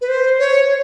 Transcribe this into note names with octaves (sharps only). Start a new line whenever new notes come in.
B4
C5
C#5